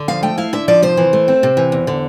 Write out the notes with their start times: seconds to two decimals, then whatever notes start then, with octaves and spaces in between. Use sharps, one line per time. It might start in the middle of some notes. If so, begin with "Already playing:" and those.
Already playing: D3
0.08 F3 F5
0.23 A3 G5
0.38 E4 F5
0.53 D3 E5
0.68 F3 D5
0.82 C3 C5
0.97 E3
1.13 A3
1.28 C4
1.43 C3
1.57 E3
1.72 E2
1.87 D3